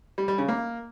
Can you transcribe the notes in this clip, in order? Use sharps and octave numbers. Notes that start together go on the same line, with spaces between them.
G3
G3
C#3
A#3